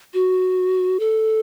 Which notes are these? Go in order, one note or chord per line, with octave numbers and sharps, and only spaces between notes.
F#4
A4